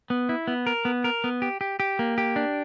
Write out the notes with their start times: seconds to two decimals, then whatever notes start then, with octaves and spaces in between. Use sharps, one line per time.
0.10 B3
0.29 E4
0.47 B3
0.66 A#4
0.85 B3
1.04 A#4
1.24 B3
1.42 G4
1.61 G4
1.80 G4
1.99 A#3
2.18 G4
2.36 D4